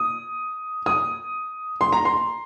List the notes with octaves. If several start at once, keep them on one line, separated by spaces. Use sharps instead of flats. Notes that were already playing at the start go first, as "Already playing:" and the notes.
Already playing: D#6
D#6
C6
A#5
C6